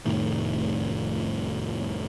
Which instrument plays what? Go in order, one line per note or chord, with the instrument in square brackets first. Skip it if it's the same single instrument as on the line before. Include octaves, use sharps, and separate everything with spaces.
[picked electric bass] F1 A2 D#3